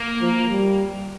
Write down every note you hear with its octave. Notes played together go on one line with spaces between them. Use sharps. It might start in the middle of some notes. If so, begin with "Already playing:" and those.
Already playing: A#3
F3
G3